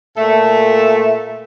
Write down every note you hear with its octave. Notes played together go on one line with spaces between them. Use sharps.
A#2 A3 A4 E5